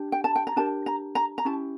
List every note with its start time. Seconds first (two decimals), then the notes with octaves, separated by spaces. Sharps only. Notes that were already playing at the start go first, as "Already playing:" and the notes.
Already playing: D4 G4
0.12 G5
0.24 A5
0.35 G5
0.47 A#5
0.56 D4 G4 A#4 A5
0.86 A#5
1.15 A#5
1.38 A#5
1.45 C#4 E4 G4 A5